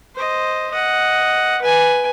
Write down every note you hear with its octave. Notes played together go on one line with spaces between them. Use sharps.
C5 D#5
D#5 F#5
B4 G#5